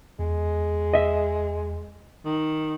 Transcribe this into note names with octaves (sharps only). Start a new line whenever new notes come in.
E2 G#3
D#5 E5
D#3